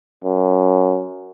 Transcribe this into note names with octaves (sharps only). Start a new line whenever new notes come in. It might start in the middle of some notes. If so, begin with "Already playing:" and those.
F#2